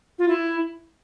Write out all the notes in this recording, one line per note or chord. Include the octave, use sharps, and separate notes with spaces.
F4
E4